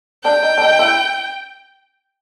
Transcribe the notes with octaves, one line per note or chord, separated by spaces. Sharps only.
D4 G5
D#4
D4
D#4
E4